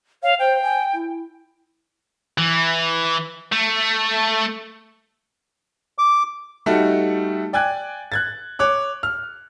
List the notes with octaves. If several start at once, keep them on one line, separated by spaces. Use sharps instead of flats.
C#5 F5
C5 G5
G#5
E4
E3
A3
D6
G3 A3 D#4 F#4 A4
D5 G5 G#5 F#6 G#6
F#6 G#6 A6
C#5 D6 F#6
F6